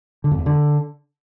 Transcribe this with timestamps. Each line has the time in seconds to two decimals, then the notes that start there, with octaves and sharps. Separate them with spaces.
0.24 D3
0.31 F2
0.39 E2
0.46 D3